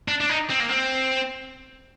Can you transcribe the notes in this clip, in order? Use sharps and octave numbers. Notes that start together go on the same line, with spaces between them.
D4
D4
D#4
C4
A#3
C4